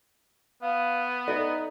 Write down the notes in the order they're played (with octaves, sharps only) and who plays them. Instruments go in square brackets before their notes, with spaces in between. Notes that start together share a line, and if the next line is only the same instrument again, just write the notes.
[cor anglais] B3 [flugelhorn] F5
[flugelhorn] D#4 [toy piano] A4 D5 E5